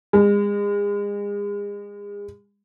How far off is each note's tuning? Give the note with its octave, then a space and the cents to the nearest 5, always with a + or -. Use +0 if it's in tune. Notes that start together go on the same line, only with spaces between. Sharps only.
G#3 -35